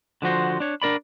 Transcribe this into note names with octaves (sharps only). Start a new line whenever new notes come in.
D3 F3 F#4 C5
D4 C#5
D4 A#4 D5 B5